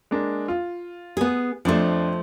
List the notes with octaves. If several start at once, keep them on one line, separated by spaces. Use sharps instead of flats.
G#3 A#3 D4
F4
B3 G#4
F2 F3 A3 D4 C6